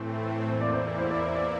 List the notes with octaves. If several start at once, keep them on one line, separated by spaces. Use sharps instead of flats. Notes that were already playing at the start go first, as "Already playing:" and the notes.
Already playing: A2 E3 A3 C4
E2 E3 A#3 E4 C5
D5
C5
D5
C5
D5
C5
D5